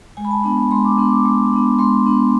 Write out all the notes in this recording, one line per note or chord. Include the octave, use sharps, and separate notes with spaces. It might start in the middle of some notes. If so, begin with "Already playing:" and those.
G#3 G#5
B5
A5
B3 D4 B5
B5
G#3 C6
D6
B3 D4 C6
D6
G#3 D6
B3 D4
G#3 C6
B3 D4